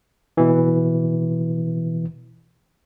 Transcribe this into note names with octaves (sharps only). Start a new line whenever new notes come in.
B2 E3